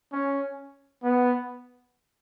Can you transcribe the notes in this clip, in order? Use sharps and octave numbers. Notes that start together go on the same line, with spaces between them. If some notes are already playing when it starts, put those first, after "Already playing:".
C#4
B3